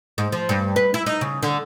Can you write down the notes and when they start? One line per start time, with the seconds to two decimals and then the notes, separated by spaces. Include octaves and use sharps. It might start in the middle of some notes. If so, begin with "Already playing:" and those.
0.18 G#2
0.32 F3
0.49 G2
0.76 B4
0.94 E4
1.06 D#4
1.21 C#3
1.42 D3